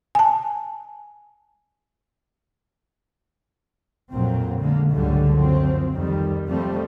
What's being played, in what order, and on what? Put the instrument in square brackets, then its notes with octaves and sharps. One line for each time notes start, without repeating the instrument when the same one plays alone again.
[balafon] G#5 A5
[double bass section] A#1 F2 F#3 A#3 C4
D3 G#3 A#3
C#2 G#2 D3 F#3 G3 A3
F#2 F3 F#3 C4
F2 D#3 G3
F2 F3 G3 A3 C4